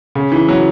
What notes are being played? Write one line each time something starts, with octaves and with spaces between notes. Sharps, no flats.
C#3
E3
F#3